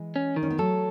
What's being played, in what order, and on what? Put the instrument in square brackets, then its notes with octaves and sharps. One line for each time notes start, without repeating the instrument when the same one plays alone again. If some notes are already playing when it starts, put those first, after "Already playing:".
Already playing: [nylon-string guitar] E3 G#3
[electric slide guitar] C#4
D#3
[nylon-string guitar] C#4
B3
[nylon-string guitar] F#3 A3 [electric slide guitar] A4